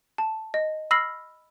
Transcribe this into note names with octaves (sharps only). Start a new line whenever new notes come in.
A5
D#5
B5 E6 F6 A#6 C7 F#7